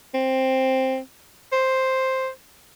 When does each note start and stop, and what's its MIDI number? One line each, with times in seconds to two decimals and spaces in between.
0.15 0.99 60
1.53 2.29 72